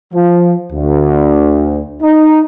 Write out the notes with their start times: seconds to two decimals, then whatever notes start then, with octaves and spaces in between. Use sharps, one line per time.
0.14 F3
0.72 D2
2.03 D#4